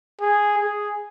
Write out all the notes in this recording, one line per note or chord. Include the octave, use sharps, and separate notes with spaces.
G#4
G#4